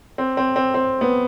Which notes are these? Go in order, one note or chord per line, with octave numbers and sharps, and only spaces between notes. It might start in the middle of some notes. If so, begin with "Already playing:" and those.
C4
C4
C4
C4
B3